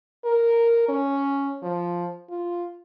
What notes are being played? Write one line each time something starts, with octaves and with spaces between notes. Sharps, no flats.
A#4
C#4
F3
F4